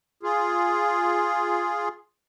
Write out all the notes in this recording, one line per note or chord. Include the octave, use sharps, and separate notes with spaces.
F4 G#4